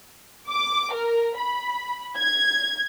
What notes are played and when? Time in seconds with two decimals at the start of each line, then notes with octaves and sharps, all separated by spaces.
0.49 D6
0.93 A#4
1.37 B5
2.17 G#6